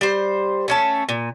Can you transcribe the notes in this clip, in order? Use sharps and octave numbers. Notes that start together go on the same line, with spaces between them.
G3 C5
A3 C#4 A5
A#2